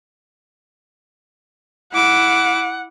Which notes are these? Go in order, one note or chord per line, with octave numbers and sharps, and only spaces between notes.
E4 F#5 D6